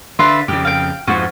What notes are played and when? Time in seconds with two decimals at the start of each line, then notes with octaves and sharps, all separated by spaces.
0.19 D3 F4 B4 E5
0.48 F2 C#3 G4
0.65 F5 G5
1.07 F2 G#2 F4 F#4